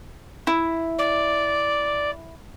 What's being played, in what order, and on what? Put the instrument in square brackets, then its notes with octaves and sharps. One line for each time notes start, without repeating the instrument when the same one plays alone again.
[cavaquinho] E4
[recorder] D5